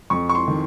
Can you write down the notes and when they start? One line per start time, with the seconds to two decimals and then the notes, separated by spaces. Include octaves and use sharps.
0.10 F2 C#6
0.29 C#6
0.35 C6
0.48 D#3